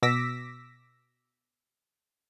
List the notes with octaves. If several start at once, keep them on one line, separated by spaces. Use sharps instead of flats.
B2 D6 E6 A#6 B6